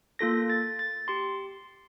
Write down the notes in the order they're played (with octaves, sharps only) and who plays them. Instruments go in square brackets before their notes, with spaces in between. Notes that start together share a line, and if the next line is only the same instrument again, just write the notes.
[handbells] A#3 F4 A4 A#6
A6
A6
G4 C6